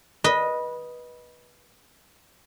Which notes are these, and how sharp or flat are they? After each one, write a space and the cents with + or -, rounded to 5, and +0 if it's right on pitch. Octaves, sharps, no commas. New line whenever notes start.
B4 -20 D#5 +0